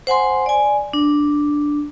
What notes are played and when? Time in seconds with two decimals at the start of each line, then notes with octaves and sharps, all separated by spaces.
0.07 C5 F#5 G#5 C6
0.46 D5 G#5
0.93 D4